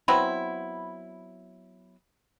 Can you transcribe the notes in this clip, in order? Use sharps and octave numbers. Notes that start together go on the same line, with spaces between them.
F#3 B3 C4 E4